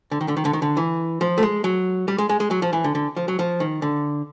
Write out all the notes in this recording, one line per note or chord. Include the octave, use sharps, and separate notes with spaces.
D3
D#3
D3
D#3
D3
D#3
D3
E3
F3
A3
G#3
F#3
G3
G#3
G#3
G#3
F#3
F3
E3
D3
D3
F3
F#3
F3
D#3
D3